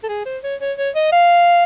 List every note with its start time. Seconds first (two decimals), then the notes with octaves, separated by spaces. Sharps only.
0.03 A4
0.09 G#4
0.26 C5
0.43 C#5
0.61 C#5
0.78 C#5
0.95 D#5
1.13 F5